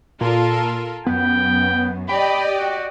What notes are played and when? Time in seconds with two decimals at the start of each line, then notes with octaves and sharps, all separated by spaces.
0.21 A#2 F4 A4 A#4
1.06 F#2 B3 G5
2.09 G4 D5 D#5 G5 B5
2.58 F#4